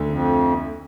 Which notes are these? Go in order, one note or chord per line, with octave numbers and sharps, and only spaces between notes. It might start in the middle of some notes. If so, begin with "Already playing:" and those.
Already playing: D2 D3
F2